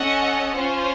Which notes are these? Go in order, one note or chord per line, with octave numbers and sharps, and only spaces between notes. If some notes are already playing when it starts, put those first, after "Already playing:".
Already playing: C#4 A4 D#5 F#5
C#4 F4 C5